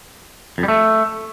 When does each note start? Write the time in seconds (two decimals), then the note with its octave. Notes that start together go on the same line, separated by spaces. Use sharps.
0.58 F2
0.63 G3
0.68 A3